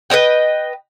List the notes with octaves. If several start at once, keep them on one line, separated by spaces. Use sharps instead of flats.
B4 C#5 D#5 G5